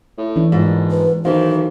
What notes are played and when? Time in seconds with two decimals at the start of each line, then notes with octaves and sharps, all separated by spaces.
0.17 A2
0.36 E3 D4
0.52 A#1 G#2
0.91 B4
1.25 B1 D#3 E3 C5 F5